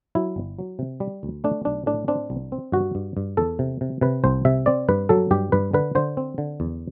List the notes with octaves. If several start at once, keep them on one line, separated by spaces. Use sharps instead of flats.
F#3 E4
G1
F#3
C3
G3
D2
A3 D4
B1 D4
A2 D4
C4 D4
C2
C4
G2 F#4
G2
G2
E2 A4
C3
C3
C3 B4
C2 C5
C3 E5
C4 D5
G2 B4
F#3 A4
G2 G4
G2 B4
D3 B4
D3 C5
C4
D3
E2